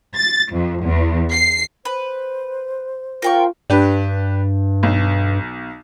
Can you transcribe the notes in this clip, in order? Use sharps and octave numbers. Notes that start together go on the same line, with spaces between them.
A6
F2
E2
C7
B4 C5
F4 A#4 G5 C#6
G2 D4 G4 B4
B1